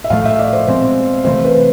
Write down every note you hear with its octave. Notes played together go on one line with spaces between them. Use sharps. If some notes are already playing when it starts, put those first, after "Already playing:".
E5
A2 F3 A3 F5
E5
D5
C5
B2 G#3 C4 C5
C3 E3 A3 C4 C5
B4